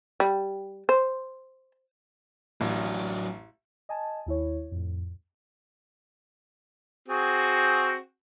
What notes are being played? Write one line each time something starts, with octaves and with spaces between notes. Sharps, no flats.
G3
C5
A1 F#3 D4
D#5 G#5 A5
D#2 E4 C#5
F2 A2
C4 F#4 G#4